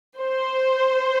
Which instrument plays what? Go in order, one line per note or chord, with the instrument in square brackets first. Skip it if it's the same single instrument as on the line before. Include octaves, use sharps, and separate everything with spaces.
[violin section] C5